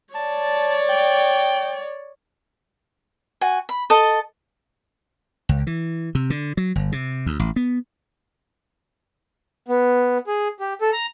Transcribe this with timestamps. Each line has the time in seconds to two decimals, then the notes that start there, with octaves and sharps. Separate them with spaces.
0.14 C#5 D5 A5
0.89 G5
3.41 F#4 G#5
3.69 B5
3.90 A4 D#5 A5
5.49 C#2
5.67 E3
6.15 C3
6.30 D3
6.57 F#3
6.75 G1
6.92 C3
7.26 D2
7.39 A1
7.56 B3
9.68 B3
10.27 G#4
10.60 G4
10.81 A4
10.93 A#5